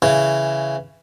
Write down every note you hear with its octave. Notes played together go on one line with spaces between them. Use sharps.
C#3 E3